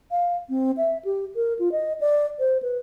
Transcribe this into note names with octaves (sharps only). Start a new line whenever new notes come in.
F5
C4
E5
G4
A#4
F4
D#5
D5
C5
B4